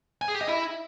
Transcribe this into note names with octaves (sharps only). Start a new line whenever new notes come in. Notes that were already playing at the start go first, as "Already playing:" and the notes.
G#5
G#4
G4
D#5
E4